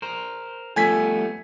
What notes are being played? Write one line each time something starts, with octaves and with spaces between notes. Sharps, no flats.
A#4 C5
F3 G3 A3 B3 A4 G#5 G#6 B6